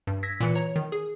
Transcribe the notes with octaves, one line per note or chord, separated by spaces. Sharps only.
G2
E6 G#6 A#6 B6
A#2 E3 C#7
C#5 A#5
D#3
G#4